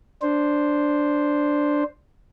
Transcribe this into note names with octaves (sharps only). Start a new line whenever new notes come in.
D4 C5